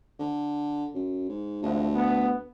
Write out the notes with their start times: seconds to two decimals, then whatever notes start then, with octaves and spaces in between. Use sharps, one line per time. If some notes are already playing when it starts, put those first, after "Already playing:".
0.19 D3
0.94 F#2
1.29 G#2
1.62 G#1 D2 E3 F3
1.95 B3